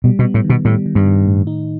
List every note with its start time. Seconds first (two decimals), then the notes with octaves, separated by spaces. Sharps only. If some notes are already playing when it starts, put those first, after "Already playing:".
0.04 B2 G3
0.19 B2
0.25 B3
0.34 A2
0.44 D#3
0.50 B2
0.65 A2 G3
0.86 D#3
0.95 G2
1.07 D#3
1.26 A2
1.47 D#4